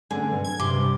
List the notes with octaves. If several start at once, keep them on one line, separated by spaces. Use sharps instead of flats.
D3 A3 C4 C#4 G#4
G2 C3 G3
F#3 D4 G#6
G2 C3 C6 D6
G3